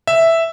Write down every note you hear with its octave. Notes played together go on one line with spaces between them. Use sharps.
E5